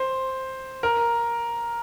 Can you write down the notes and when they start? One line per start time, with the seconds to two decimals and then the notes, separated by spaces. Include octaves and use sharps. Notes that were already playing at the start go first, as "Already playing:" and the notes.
Already playing: C5
0.83 A#4